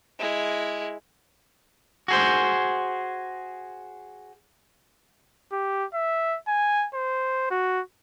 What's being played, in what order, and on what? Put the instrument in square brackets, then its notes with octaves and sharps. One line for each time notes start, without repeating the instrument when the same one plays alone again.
[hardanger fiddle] G#3 E4
[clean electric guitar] F#4 G#4 C5
[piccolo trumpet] G4
E5
G#5
C5
F#4